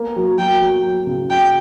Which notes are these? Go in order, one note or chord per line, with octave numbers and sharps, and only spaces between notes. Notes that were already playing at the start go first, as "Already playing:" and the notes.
Already playing: A#3
F#3
F#3 G5
F#3
F#3
C#3
F#3 G5